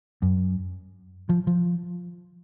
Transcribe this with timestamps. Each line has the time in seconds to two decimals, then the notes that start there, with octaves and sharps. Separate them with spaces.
0.22 F#2
1.29 F3
1.47 F3